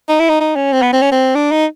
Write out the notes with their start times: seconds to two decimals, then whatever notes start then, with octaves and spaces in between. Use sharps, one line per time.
0.09 D#4
0.20 E4
0.29 D#4
0.41 D#4
0.56 C#4
0.72 C4
0.82 B3
0.93 C4
1.02 C#4
1.12 C4
1.35 D4
1.51 D#4